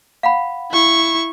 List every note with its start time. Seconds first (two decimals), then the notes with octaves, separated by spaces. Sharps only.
0.23 F5 F#5 B5
0.72 E4 C#6